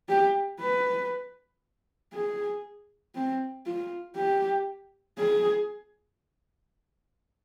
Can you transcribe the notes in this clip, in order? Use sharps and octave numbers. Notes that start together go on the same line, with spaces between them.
G4
B4
G#4
C4
F4
G4
G#4